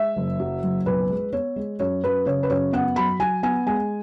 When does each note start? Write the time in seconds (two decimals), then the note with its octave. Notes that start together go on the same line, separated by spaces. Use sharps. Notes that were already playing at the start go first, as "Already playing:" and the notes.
Already playing: G#3 E5
0.16 F#1
0.39 F#3
0.63 F#1
0.86 B1 B4
1.09 G#3
1.33 B3 C#5
1.56 G#3
1.80 F#2 C#5
2.03 F#2 B4
2.26 C#3 C#5
2.43 B4
2.50 F#2 C#5
2.73 B3 F#5
2.96 F#3 B5
3.20 F#3 G#5
3.43 B3 G#5
3.67 G#3 G#5